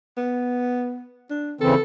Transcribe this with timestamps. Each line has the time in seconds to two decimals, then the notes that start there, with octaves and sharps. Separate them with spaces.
0.17 B3
1.30 D4
1.61 C#3 E3 C4 A4